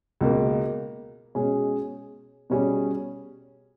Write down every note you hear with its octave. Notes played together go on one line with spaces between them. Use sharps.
C#2 B2 A#3
B2 G#3 C#4 G#4
B2 G3 C#4 G#4